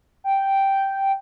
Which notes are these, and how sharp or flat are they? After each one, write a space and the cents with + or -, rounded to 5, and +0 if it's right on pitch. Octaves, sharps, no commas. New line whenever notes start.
G5 -5